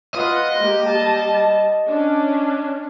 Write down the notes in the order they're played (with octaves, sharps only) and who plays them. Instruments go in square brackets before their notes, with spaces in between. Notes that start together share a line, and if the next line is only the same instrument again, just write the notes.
[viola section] F4 B4 F#5 [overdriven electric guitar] D#5
[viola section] G#3 A#3 G4
G3 A5
C#4 D4